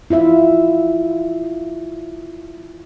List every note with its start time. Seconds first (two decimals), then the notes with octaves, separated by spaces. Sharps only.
0.10 E4 F4 E5